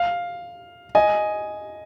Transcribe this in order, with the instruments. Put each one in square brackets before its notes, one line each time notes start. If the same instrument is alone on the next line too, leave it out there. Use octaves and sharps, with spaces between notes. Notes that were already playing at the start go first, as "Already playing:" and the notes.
Already playing: [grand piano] F5
D#5 G#5